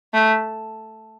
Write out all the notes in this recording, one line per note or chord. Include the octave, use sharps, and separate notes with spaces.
A3